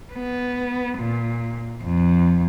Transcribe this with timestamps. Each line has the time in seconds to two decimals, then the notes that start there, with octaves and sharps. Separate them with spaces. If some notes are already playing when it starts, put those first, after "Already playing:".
0.14 B3
0.99 A#2
1.84 F2